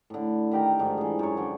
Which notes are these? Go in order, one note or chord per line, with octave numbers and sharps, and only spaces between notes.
A2 D3
D#3 G4 G5 A#5
G#2 D3 F3 A3
E3 G#4
F#2 C#5
D3 F3